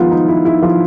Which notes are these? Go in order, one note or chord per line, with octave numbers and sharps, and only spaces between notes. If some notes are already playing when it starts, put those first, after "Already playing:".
Already playing: D#3 F3 G#3 B3 D#4 F4 B4
D#4
E4
E4
F3 F4